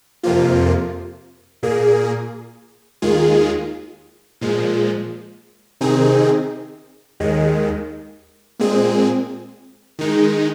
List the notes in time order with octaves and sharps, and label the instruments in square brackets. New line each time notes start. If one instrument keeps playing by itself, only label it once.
[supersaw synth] F2 C3 F3 A#3 F4
A#2 A#3 G#4
D#2 D#3 G#3 F4 G#4
A#2 F3 G#3
C3 D#3 C4 D#4 G#4
D#2 D#3 G#3
A#2 G#3 C4 G#4
D#3 G#3 D#4